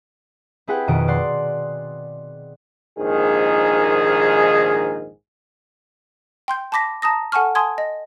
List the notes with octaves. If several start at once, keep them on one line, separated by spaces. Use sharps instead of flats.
C4 E4 G#4 B4 F#5 G5
F2 B2 D#3 D#5 D7
D5 F#5 C6
A#1 D#2 G#2 D#3 G#4
G5 C6 G6
A5 B5 D6 A#6 B6
A5 A#5 D#6 A#6
A4 F#5 G#5 A5 C#6 F6
G#5 A5 C6 D#6 G#6
D#5